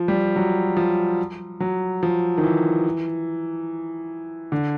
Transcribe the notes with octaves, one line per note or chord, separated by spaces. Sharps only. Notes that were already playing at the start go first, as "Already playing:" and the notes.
Already playing: F3
G3
F#3
F3
F#3
F3
D#3
E3
D3